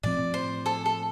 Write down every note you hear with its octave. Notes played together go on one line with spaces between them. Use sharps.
A2 F3 C4 D5
C5
A4
A4